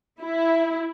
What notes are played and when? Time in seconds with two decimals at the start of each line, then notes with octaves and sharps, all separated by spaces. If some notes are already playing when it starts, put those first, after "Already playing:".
0.21 E4